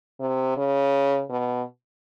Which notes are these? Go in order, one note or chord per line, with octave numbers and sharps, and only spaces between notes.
C3
C#3
B2